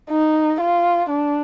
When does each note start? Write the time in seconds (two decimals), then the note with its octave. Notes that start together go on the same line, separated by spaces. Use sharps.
0.10 D#4
0.61 F4
1.10 D4